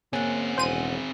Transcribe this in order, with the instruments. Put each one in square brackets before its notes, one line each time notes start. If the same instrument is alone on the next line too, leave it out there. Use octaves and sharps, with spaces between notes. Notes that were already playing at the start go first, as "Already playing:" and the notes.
[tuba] A#3 [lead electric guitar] C4 G#4 [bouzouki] C#4 F#5
[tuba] E1 [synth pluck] C5 D#7